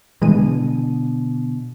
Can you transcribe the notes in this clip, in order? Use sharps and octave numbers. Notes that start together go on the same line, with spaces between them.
B2 D3 E3 G#3 D#7